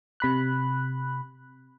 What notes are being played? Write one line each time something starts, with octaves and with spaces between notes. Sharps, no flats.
C3 B5 F#6